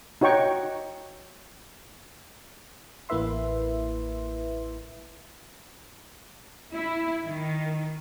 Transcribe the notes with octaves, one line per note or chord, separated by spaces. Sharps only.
D#4 F#4 C#5 G5 C#6
A1 A#3 E4 B4 E5 C6
E4
D#3